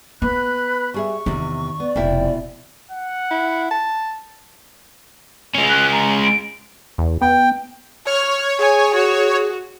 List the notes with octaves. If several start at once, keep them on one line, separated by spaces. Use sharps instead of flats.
B3 B4 B5 F#6
G3 G#4 E5 C#6
E2 C3 D#3
B3 D5
F1 B2 A#3 E4 G5
F#5
E4
A5
G#3 C#4
F#6
A#5
D7
E2
B3 G5
C#5 F6
G#4 G#5
F#4